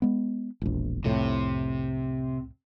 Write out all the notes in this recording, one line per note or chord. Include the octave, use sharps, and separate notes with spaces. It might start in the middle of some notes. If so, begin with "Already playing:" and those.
G#3 B3
E1 A#1
C2 F2 A2 C3